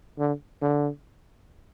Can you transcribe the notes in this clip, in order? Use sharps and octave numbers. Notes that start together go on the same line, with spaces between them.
D3
D3